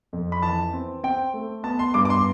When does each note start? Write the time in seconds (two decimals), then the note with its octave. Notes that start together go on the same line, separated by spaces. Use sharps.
0.13 F2
0.32 B5
0.42 E3 A5
0.73 C4
1.04 C4 G5
1.34 A3
1.63 B3 A5
1.79 C6
1.94 G2 D6
2.05 D6
2.10 C6